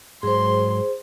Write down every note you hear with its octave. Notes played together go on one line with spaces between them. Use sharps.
G#2 F#3 G#4 C5 C6